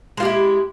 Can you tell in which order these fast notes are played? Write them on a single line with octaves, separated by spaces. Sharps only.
G#3 F4 G4 E4